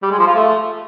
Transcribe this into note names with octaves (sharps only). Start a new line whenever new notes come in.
G3
G#3
F3
F4
A3